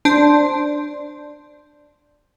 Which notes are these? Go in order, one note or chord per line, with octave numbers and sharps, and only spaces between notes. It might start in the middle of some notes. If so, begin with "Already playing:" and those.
D4 C5